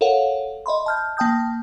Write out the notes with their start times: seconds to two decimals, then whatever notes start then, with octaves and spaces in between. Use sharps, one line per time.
0.01 A4 A#4 C#5 F5 F#5
0.66 D#5 E5 B5 C6
0.86 A5 F6 G6
1.17 A#3 G5 A5 D#6 G6